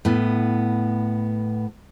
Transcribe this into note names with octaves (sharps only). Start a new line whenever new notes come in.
A2 B3